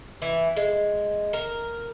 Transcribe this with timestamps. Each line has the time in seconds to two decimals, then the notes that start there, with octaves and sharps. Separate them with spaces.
0.22 E3
0.56 G#3
1.33 A#4